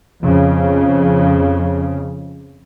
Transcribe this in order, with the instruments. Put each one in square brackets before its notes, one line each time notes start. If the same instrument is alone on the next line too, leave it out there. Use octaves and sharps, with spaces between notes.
[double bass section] F2 C#3